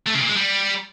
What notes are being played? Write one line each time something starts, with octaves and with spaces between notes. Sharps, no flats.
A3
C#3
A#2
G#3
G3